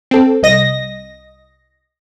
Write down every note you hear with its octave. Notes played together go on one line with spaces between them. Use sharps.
C4 A4
C2 D#5 A#6